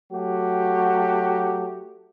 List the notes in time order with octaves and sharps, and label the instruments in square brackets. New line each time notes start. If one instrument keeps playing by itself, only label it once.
[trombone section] F#3 A3 F#4 G4